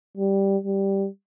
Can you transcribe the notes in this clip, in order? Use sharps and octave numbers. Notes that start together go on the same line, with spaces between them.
G3
G3